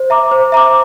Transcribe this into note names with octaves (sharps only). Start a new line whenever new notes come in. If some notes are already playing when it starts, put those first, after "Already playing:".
Already playing: C5
E5 A#5 D6
C5
E5 A#5 D6